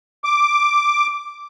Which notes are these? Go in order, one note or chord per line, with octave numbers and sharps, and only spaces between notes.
D6